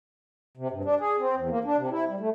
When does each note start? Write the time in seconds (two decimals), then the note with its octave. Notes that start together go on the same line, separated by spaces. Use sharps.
0.57 C3
0.71 G2
0.85 D4
1.00 G#4
1.18 C4
1.35 E2
1.50 A#3
1.65 D4
1.77 C3
1.91 E4
2.08 G3
2.20 A3